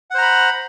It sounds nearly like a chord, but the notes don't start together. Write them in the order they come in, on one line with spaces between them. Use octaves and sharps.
F#5 C5 A#5 B5